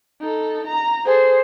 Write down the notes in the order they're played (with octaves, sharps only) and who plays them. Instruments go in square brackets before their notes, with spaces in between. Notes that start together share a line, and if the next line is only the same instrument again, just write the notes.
[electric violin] D#4 A4
A#5
[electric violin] G#4 A4 [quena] C5